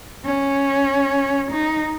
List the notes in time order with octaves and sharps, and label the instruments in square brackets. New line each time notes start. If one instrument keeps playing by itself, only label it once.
[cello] C#4
D#4